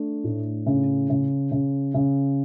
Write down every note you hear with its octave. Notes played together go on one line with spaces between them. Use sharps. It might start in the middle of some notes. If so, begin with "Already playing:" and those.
Already playing: A3 D4
A2
C#3
C#3
C#3
C#3